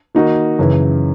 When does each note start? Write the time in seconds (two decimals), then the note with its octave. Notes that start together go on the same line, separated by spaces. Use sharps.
0.15 D#3 A#3 D#4 F#4
0.59 F#2 C#3 E3